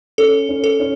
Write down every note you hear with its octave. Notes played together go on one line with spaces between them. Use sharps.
C#4 A4
C#4
A4
C#4